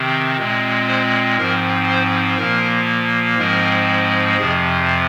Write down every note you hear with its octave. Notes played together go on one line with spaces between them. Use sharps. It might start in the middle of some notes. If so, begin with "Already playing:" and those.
Already playing: C3 D#3 C4
A#2 G#3 C4
C5
G#2 F3 C4 A#4
C5
A#2 F3 A#3 A#4
G#2 F3 G#3 C4 A#4
F2 C3 F3 G#4